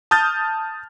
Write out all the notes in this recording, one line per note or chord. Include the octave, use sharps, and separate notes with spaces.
A5 D#6 F6 G6 A6